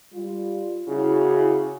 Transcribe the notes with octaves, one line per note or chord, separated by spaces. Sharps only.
G3 F4
C#3 E4 F#4